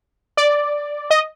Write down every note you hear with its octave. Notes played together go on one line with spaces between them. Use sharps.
D5
D#5